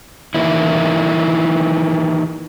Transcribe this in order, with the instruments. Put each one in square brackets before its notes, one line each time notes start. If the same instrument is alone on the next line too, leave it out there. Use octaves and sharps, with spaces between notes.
[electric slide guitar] D#3 E3 A#3 E4